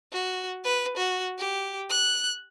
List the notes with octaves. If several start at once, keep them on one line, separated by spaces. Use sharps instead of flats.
F#4
B4
F#4
G4
F#6